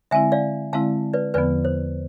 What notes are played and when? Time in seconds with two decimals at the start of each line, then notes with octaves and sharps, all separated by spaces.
0.11 D3 G#3 C4 E4 E5 G#5
0.32 D5 F5
0.73 D3 G#3 C4 E4 F5 A5
1.13 B4 D5
1.34 E2 D3 F3 B3 B4 D5
1.65 C5